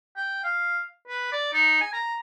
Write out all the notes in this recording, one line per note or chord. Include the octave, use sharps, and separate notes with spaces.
G5
F5
B4
D5
D#4
G#5
A#5